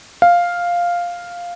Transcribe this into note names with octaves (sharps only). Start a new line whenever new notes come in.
F5